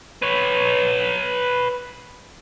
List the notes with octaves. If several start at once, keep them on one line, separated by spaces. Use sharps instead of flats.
B4 C#5